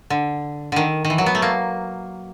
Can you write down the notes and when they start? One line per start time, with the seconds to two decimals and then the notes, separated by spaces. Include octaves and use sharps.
0.10 D3
0.72 D3 D#3
1.05 D#3
1.10 E3
1.18 F#3
1.26 B3
1.35 A3
1.42 A#3